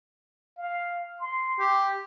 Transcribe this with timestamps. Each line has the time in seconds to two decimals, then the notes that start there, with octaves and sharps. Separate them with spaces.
0.57 F5
1.19 C6
1.60 G4